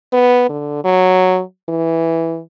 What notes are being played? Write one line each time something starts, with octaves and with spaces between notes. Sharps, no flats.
B3
D3
F#3
E3